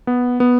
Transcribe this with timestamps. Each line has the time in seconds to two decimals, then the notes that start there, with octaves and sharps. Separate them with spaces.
0.07 B3
0.40 B3